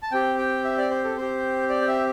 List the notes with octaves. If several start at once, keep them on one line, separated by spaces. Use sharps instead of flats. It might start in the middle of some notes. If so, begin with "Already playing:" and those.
A5
C4 G4 G5
G5
E5
D5
C5
A4
C4 G4 C5
D5
G5
E5